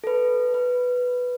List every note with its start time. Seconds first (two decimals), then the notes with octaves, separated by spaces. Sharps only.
0.04 A4
0.07 B4
0.54 B4